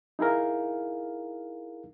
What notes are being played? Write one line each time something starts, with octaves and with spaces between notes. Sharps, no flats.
D#4 E4 G#4 A#4 F5